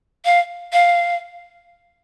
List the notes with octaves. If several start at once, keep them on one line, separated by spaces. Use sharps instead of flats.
F5
F5